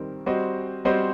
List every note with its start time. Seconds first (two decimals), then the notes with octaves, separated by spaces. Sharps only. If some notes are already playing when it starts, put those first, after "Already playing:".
Already playing: D#3 G3 C4 A#4
0.26 G3 C4 F#4 C5 D#5
0.85 G3 C4 F#4 C5 D#5